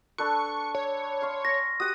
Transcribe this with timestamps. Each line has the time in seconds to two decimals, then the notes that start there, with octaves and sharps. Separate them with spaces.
0.18 D4 A4 B4 C#6
0.39 C#6
0.75 C#5
1.22 F5 C6 C#6
1.45 G#5 A#6
1.80 F#4 G4 F#5 D#6